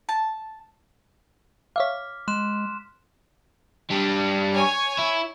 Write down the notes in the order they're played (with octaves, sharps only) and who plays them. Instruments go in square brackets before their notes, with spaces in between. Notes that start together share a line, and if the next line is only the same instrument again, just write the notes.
[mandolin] A5
[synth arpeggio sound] C#5 E5 F5 [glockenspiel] D6 F6 B6
[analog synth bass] G#3 [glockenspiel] C6 F#6 E7
[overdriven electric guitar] G3 D4
[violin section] C#5 G#5 C#6
[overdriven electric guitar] E4